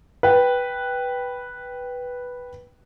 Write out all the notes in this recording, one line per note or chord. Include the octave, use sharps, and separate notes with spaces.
B4 G5